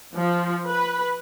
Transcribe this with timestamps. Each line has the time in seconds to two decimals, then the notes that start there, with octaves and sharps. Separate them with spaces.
0.15 F3
0.67 B4